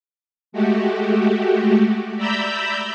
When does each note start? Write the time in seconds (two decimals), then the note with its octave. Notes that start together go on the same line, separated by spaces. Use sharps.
0.52 G#3 A3 F#4 G4
2.16 D5 E5 A#5 B5 E6 G6